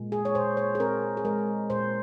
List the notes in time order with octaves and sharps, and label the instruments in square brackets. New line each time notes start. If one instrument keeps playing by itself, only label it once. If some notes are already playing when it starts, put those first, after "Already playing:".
Already playing: [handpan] A#2 G#3
G#4
C#5
A#2 C5
C#5
G#4
C4 A#4
G#4
G#3 A#4
A#2 C5